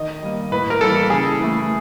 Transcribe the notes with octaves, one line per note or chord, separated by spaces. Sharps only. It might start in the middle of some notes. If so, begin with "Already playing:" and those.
Already playing: D#3 D#5
G3 A#3
A2 B4
A#4
E3 G3 A#3 A4
C#3 G#4
E3 A3